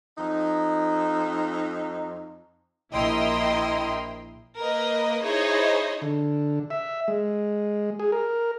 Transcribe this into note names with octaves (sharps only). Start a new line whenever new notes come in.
F2 D#4
A#1 E4 A#4 D#5 G5 C6
A#3 A#4 B4 D#5
D#4 E4 G#4 C5 C#5 D#5
D3
E5
G#3
G#4
A#4